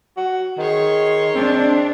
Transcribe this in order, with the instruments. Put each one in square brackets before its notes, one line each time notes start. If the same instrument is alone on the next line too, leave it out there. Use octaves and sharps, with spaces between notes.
[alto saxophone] F#4
[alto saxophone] D#3 [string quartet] G#4 C#5 C6
[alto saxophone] C4 [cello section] D4